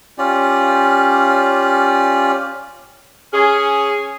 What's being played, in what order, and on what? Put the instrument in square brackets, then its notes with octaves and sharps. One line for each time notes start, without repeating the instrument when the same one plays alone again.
[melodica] C#4 F4 G4 D5
[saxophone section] C#4 G#4